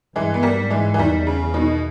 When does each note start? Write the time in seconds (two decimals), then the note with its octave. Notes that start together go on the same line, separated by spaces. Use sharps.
0.15 G2 E3 G#3
0.34 B3
0.43 G3 A#3
0.56 G#2
0.70 E3 G#3
0.94 E3
0.98 E2 D#3 G3
1.27 C#3
1.54 B2 D#3